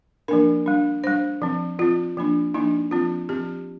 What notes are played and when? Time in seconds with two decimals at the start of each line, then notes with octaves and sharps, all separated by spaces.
0.28 F3 A#3 D4 A#4
0.66 G3 D4
1.04 G3 D4 C5
1.42 F3 C4
1.79 F3 C4 F4
2.17 F3 A#3 D4
2.54 F3 A#3 D4 D#4
2.91 F3 C4 F4
3.29 F3 C4 G4